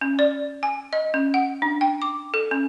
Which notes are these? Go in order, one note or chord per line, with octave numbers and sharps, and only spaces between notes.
C#4
D5
G#5
D#5
C#4
F#5
D4
G5
D6
A4
C#4